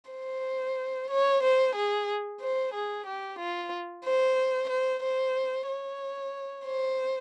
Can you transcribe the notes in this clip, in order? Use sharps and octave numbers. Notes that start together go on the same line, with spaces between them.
C5
C#5
C5
G#4
C5
G#4
G4
F4
C5
C5
C5
C#5
C5